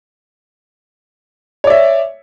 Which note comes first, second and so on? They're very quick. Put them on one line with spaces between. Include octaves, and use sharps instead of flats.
C#5 D5 E5